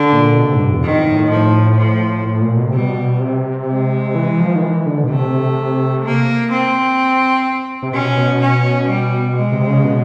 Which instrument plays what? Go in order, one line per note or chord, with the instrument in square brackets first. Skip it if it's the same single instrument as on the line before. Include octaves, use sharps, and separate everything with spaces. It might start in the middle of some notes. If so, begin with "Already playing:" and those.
Already playing: [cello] D3
[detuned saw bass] A#2
B2
C3
G#2
G2
E2
[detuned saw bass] F2 [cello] D#3
[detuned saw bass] A2
[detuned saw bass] A2 [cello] F3
[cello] F3
[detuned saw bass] A2
A#2
B2
C3
[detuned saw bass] B2 [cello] G3
[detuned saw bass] C3
[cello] G#3
[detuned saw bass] E3
F3
D#3
E3
D3
B2
[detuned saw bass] C3 [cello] A3
[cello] A#3
C4
[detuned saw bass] C3
[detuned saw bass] B2 [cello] C#4
[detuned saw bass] B2
[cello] C#4
G3
G#3
[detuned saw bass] C3
C#3
B2